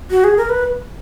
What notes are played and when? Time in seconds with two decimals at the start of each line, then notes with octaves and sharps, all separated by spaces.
0.11 F#4
0.24 G#4
0.37 A#4
0.49 B4